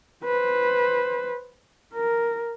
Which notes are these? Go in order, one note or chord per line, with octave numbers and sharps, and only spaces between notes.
B4 C5
A#4